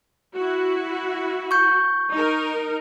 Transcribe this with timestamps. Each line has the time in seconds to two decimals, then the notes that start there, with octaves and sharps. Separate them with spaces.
0.35 E4 F#4
1.51 C#6 G6
2.11 D#4 A#4